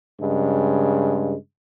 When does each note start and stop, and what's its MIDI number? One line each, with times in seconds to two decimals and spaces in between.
0.20 1.34 43
0.20 1.34 49
0.20 1.34 56